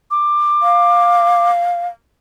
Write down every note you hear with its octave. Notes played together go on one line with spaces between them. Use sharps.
D6
F5